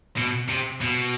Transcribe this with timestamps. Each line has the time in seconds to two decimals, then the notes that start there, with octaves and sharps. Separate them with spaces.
0.17 B2
0.49 C3
0.81 B2